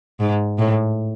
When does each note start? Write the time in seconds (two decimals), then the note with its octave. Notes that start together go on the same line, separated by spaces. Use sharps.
0.20 G#2
0.58 A2